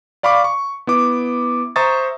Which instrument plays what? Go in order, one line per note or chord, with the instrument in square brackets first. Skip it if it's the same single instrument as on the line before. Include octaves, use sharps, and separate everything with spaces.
[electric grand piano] D5 F5 B5 C#6 D6
C#6
B3 E4 D6
C5 E5 A#5 C#6 D#6 A6